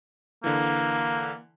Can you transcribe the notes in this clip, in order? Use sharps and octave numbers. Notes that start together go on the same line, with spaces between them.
D3 E3 A#3